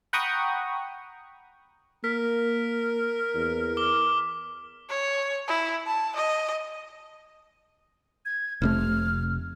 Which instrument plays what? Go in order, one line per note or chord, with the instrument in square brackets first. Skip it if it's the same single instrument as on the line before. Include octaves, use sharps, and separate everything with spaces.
[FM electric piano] F#5 G5 A#5 B5 C#6 D#6
[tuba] A#3 [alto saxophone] A#4 [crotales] B6
[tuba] E2
[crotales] D6 G7
[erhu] C#5
E4
A5
D#5
[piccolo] G#6
[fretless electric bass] F1 C3 A3 [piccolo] F6